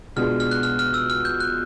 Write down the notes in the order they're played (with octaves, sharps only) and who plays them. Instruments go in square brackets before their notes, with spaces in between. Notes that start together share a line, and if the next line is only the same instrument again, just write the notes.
[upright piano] B2 G#3 B3 D4 F4 [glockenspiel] F6
[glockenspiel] F6
F#6
F6
F6
E6
F6
G6
F#6